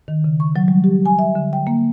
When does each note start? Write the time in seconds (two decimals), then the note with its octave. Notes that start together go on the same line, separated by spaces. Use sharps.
0.08 D#3
0.24 C#3
0.40 C#6
0.56 F#3
0.68 G3
0.84 G4
1.06 G#5
1.19 E5
1.35 D3
1.53 G5
1.67 A#3